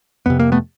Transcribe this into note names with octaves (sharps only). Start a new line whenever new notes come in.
F2 C3 B3
A#3
A3 B3